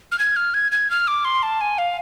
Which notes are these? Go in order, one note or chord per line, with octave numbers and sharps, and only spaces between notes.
F6
G#6
F6
G#6
G#6
F6
D6
C6
A5
G#5
F5